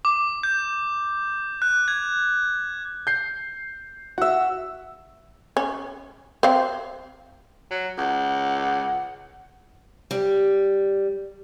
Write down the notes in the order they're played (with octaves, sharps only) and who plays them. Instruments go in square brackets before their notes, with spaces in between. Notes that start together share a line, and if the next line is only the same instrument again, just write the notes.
[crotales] D6
G6
F#6
G#6
[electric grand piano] G6 C7
[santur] F#4 E5 [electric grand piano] F#5 E6
[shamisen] C#4
C4 F5
[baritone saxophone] F#3
[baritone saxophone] C#2 [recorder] F#5
[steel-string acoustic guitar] G3